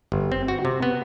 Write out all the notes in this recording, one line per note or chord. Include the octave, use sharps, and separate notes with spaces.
G1
C4
F#4
C3
B3